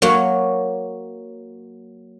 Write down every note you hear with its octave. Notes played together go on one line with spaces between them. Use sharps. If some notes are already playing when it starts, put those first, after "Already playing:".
F#3 A#3 F#4 C#5